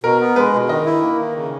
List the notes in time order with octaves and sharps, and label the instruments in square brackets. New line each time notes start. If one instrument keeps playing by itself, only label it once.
[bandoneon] B2 [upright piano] A#4
[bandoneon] B3
[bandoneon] G#3 [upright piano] B4
[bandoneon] B2
[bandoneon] D#3 [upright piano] D#5
[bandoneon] E4
A#3
D#3
C#3